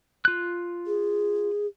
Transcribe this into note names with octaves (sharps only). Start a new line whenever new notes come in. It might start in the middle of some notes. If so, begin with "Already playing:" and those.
F4 F#6
G#4